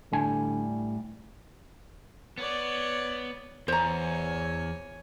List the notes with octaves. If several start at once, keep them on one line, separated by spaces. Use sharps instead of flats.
A2 D3 G3 G#5
B3 C#5 D5
E2 C5 C#5 G#5 A#5